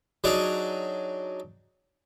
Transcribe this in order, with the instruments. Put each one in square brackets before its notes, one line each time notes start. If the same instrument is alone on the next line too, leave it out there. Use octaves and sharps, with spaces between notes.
[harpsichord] F#3 D4 D#4 G#4